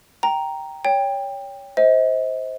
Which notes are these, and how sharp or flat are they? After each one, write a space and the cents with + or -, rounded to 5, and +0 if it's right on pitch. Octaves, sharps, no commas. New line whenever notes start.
G5 +0 A#5 +0
C#5 +20 G5 +20
C5 +0 D#5 +40